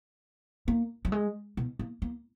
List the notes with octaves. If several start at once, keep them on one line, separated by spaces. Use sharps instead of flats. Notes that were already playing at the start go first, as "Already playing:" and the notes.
A#3
F#3
G#3
B2
A#3
A#3